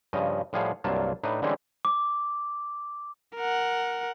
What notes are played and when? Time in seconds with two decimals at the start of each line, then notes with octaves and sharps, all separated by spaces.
0.13 G2 C#3 F3 D#5
0.53 A2 F3 G3 G#4 F5 F#5
0.84 C2 G2 F#3 A#3 F4 A5
1.24 A2 D4 D#4 B4
1.42 D3 E3 G3 G#3 C4 C#4
1.85 D6
3.36 A#4 F#5